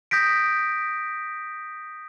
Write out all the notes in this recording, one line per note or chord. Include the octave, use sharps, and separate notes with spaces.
D#6 G6 A#6 B6 D7